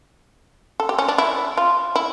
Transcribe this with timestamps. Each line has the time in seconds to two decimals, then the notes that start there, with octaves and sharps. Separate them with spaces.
0.80 A4
0.89 G4
0.98 C#4
1.08 D4
1.18 E4
1.57 F4
1.96 E4